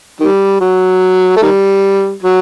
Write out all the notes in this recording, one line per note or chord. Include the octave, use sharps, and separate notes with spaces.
D#3 G3
F#3
A3
D#3 G3
F#3